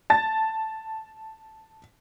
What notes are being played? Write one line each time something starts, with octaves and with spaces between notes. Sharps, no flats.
A5 A6